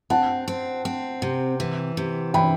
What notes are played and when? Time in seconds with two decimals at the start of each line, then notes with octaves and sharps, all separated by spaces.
0.10 C4 F#5 A5
0.48 C4
0.85 C4
1.22 C3
1.60 E3
1.97 C3
2.34 E3 G5 B5